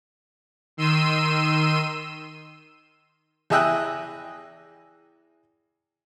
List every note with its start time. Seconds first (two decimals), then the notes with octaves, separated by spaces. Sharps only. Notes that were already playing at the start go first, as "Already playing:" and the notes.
0.77 D#3 C6 E6 D#7
3.50 E2 G#4 D#5 E5 G5 F#6